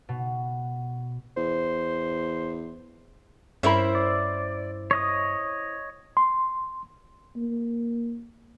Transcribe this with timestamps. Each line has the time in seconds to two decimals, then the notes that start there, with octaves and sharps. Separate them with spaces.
0.09 B2
1.37 E2 C5
3.63 G2 C#4 E4 A#4 C5 E5 B5
3.95 D5
4.91 C#5 D#5 D#6
6.17 C6
7.36 A#3